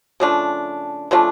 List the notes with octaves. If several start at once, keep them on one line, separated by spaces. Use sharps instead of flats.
C#3 F3 A3 D4
C#3 F3 A3 D4